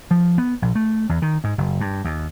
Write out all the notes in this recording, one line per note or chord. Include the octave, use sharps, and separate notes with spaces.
F3
B3
A#1
A3
E2
D#3
G#2
F#1
G2
D#2